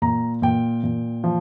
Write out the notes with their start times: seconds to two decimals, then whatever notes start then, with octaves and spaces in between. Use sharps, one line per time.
0.02 A#2 A#5
0.42 A#2 G5
0.84 A#2
1.24 F3